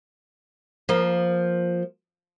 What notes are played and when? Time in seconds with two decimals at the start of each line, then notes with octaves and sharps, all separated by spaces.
0.89 F3 A#3